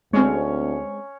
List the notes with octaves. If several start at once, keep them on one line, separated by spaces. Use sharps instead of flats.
D2 G#3 C4 C#4 C#5